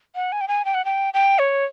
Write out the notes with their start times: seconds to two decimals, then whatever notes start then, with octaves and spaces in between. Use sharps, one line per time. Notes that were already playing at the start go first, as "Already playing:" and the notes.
0.15 F#5
0.32 G#5
0.41 G5
0.48 G#5
0.65 G5
0.74 F#5
0.85 G5
1.14 G5
1.39 C#5